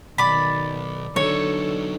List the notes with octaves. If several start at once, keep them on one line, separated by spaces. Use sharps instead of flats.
B1 D#3 D5 B5
D3 F#3 D#4 A4 C#5